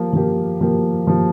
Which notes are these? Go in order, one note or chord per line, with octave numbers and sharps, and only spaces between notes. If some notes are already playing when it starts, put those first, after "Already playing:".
Already playing: F3 A#3 G4
F3 A#3 G4
F3 A#3 G4
F3 A#3 G4